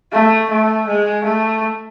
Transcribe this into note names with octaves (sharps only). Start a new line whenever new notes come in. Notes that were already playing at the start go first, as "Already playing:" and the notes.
A3
A3
G#3
A3